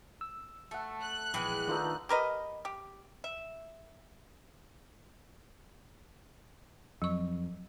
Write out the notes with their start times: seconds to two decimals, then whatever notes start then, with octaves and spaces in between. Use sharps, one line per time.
0.21 E6
0.71 A3 A4 F#5
1.02 F#6
1.34 A#1 E3 G#3 B3 G5
1.68 D3 D#3 A3 D#4 F4 B4
2.09 G4 A#4 B4 D#5
2.65 G4
3.24 E5
7.02 F2 F#3 C#6